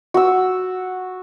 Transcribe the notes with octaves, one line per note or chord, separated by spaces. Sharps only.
F#4 E6